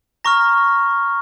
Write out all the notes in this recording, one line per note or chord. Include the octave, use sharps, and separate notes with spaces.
A#5 C#6 F6 A#6